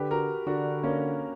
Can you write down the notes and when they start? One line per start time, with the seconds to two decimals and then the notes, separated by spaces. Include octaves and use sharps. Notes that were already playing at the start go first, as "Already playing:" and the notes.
Already playing: D3 G4 B4
0.11 F#4 A#4
0.47 D3 D4 F#4
0.83 A#3 C#4